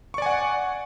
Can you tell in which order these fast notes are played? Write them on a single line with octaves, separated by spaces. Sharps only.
C#6 D5 G#5 F#5